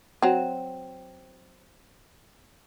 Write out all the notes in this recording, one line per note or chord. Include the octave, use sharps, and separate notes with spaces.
F#3 C4